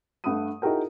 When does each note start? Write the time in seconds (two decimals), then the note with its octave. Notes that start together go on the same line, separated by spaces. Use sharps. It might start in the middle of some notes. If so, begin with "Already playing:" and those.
0.24 G2 A3 F#5 B5 D#6 D#7
0.62 D#4 E4 F#4 G#4 A#4 G5